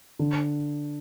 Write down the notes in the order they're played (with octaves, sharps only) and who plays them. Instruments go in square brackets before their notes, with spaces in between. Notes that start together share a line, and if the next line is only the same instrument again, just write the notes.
[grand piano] D3